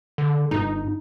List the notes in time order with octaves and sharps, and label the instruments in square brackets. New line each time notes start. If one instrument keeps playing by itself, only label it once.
[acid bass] D3
[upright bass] G1 [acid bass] D#4